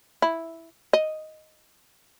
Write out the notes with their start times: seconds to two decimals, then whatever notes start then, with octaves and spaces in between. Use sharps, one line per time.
0.22 E4
0.93 D#5